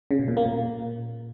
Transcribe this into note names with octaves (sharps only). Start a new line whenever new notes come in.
C#3
B2
A#2
A#3
A#2